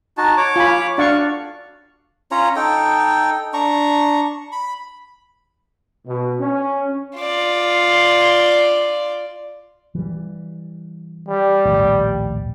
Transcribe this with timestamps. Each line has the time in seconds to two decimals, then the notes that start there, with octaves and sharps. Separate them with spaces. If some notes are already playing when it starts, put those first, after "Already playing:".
0.18 D#4 F#4 A5
0.37 C#5 D6
0.56 F4 G#5 B5
0.98 D4 F#4 D5 F5 C#6
2.31 C#4 F4 C#5 A#5
2.56 D#4 A4 G5
3.54 D4 A#5 C#6
4.52 B5
6.07 B2
6.40 C#4
7.18 F4 D5
9.95 E3 G3
11.29 G3
11.65 A#1 D#2 A2